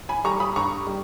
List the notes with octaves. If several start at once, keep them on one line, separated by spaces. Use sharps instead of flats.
G#5 B5
G3 A#5 C#6
B5 D#6
G2 A#5 C#6
G3